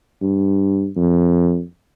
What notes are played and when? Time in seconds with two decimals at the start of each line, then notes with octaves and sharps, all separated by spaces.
0.22 G2
0.96 F2